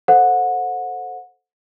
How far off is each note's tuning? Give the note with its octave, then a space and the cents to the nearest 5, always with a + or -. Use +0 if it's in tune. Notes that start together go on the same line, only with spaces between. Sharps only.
A4 +0 C5 +0 F#5 -25